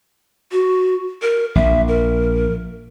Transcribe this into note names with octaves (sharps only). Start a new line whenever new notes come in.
F#4
A#4
A#1 E5
A#4